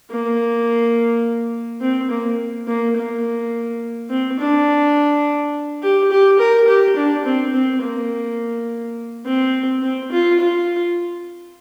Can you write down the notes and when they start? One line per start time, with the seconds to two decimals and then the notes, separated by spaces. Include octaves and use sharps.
0.11 A#3
1.81 C4
2.10 A#3
2.68 A#3
2.96 A#3
4.10 C4
4.39 D4
5.82 G4
6.11 G4
6.39 A#4
6.68 G4
6.96 D4
7.25 C4
7.54 C4
7.82 A#3
9.25 C4
9.82 C4
10.12 F4
10.39 F4